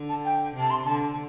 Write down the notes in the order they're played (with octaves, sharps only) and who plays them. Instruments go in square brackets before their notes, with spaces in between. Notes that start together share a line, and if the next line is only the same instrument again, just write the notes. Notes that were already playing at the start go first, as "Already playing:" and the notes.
Already playing: [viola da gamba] D3
[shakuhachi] A5
G5
[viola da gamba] C3 [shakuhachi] A5
[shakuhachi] C6
[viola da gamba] D3 [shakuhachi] A5